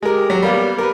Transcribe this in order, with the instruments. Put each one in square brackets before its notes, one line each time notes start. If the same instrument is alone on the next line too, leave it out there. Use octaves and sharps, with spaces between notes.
[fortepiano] G#3 A#4 [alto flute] G4
[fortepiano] F#3
G3 A#3 B3
A#4 B4